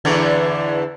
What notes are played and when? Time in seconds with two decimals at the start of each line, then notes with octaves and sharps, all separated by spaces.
0.05 E2 D3 E3